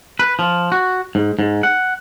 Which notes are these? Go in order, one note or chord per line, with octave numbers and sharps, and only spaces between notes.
B4
F3
F#4
G#2
G#2
F#5